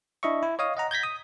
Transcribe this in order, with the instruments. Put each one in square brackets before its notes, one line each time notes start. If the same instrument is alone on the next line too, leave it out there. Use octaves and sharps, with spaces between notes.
[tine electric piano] D4 E4 D#5 E5 C#6
E4
C#5 D#5 F5 D#6
D#5 F#5 A#5
G6 G#6 A#6 B6
D#6